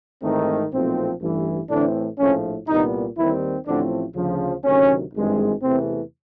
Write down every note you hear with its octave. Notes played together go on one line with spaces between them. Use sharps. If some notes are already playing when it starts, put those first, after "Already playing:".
G#1 G#2 D#3 E3 A3 C4 D#4
B1 A#2 F3 A3 C4
A1 G2 E3
A2 D3 E3 A3 C4 D4
A#1 A2 F3 A3 C#4
C2 A#2 D#3 G3 B3 D#4
D#2 D#3 E3 G3 C4 E4
A1 A2 D3 F3 A3 C4 D4
D2 C#3 F3
D2 C3 D#3 F#3 C#4
G#1 G2 E3 G#3 C4
E2 C3 E3 A3 C4